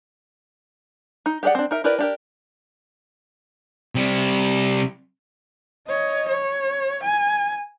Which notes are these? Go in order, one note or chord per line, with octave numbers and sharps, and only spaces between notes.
D#4
G4 G#4 A#4 D5 F#5
C4 D4
D#4 A#4 E5
E4 G4 A#4 B4 D5
D4 G4 A#4
C3 G3
C#5 D#5
C#5
G#5